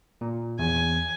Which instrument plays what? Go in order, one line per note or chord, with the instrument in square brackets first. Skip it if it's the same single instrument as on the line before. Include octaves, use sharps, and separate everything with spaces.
[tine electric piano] A#2
[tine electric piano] E2 [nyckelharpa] G#5